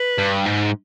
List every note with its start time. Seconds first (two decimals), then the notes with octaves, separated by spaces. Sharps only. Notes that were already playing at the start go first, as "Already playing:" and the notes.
Already playing: B4
0.18 G2
0.46 G#2